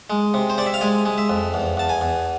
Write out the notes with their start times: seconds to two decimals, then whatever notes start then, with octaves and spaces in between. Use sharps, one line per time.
0.10 G#3
0.34 C3
0.50 C5
0.58 C3 D5
0.66 E5
0.74 F5
0.81 G#3 G#5
1.06 G#3
1.18 E5
1.30 F2
1.54 E2
1.77 E2 A5
1.89 G#5
2.01 E2